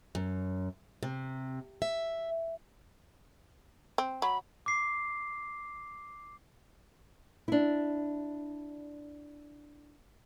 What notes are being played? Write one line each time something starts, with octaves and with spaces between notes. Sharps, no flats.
F#2
C3
E5
C4
F#3 B5
D6 C7
D4 E4